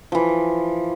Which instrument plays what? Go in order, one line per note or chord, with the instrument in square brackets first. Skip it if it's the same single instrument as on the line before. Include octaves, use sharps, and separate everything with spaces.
[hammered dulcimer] E3 F3